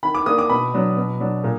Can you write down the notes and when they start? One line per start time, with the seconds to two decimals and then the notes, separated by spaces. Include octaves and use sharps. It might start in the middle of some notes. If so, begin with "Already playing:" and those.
0.03 D#3 B5
0.15 D6
0.26 A#3 D4 D#6
0.38 D6
0.49 B2 B5
0.74 F#3 D4
0.97 B2
1.20 F#3 D4
1.44 A#2